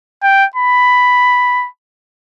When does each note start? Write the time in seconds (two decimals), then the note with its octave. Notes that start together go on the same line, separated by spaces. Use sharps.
0.23 G5
0.55 B5